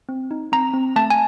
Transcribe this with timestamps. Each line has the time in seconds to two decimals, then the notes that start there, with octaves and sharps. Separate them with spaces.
0.09 C4
0.31 D#4
0.52 C4 A#5
0.74 C4
0.96 A3 A5
1.10 G#5